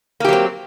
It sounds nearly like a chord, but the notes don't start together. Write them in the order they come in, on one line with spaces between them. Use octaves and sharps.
A#3 G4 F#3 C4